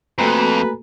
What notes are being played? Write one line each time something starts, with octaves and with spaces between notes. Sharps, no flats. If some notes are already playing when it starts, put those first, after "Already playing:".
F2 A3 A#3 F#4 A4 B4 G#5 A#5